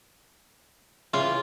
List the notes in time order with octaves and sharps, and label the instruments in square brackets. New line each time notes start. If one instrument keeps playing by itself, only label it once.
[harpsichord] C#3 E3 [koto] F4